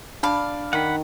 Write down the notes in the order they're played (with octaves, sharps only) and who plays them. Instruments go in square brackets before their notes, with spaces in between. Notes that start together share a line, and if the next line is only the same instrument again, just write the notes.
[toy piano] D4 A5 B5 [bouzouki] D5 F5
[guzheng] D#3 [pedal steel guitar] F#5 B5